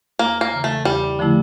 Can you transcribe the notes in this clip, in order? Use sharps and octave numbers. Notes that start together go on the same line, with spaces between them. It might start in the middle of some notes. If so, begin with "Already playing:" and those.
E2 A#3
A#3
C#3 E3
A3
E2 G3
D3 F3 A3 E4